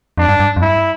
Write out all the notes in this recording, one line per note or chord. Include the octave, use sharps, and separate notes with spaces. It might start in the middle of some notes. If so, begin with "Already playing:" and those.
F2 D4
G2
G2
F2
G2 E4